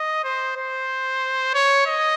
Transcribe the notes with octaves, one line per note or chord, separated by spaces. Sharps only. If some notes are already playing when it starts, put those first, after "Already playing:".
Already playing: D#5
C5
C5
C#5
D#5